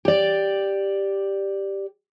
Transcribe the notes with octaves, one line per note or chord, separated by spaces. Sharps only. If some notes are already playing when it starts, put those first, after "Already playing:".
G4 D5